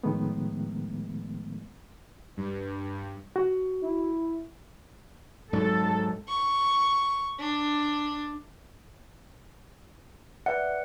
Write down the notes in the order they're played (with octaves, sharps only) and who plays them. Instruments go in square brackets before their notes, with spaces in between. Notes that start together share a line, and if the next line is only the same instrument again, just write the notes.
[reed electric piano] A2 D#3 F3 G#3 A3 B3
[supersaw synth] G2
[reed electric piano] F#4
[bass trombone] E4
[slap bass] G#2 F#3 [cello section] A4
[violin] C#6
D4
[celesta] B4 D5 E5 [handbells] F#5